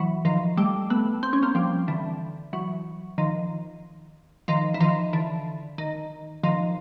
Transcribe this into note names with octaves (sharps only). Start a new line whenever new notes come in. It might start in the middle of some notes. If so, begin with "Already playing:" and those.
Already playing: E3 F#3
D#3 F3
G3 A3
A3 B3
C4
C#4
A#3 C4
F3 G3
D3 E3
E3 F#3
D#3 F3
D#3 F3
E3
D#3 F3
D3 E3
D#3
D#3 F3